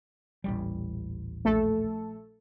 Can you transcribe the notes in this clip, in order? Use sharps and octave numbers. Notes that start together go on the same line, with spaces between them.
D#1 A1 G3
A#1 A3 A4